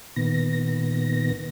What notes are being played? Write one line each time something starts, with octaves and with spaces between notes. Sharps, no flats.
A#2 D#3 B3 A#6